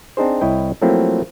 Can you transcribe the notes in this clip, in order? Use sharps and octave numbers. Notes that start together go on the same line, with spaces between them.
C4 D4 D#4 G#4 C5
C2 E4 C#5 D#5 G5
F3 F#3 A3 A#3 C4 E4